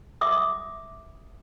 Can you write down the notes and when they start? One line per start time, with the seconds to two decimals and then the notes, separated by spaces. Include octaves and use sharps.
0.21 E5 D6 D#6